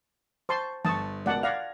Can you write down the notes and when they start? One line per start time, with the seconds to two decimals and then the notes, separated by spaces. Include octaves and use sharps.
0.49 C5 A5 C6 C#6
0.85 G1 A5 C#6 D#6
1.26 C#2 B2 A#4 D5 F#5 A5
1.43 D5 F5 F#5 G#6 A#6 F7